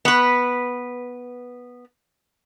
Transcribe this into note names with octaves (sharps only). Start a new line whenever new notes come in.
B3 B4